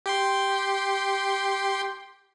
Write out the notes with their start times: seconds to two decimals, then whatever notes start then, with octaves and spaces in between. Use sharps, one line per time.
0.06 G4 G5 C6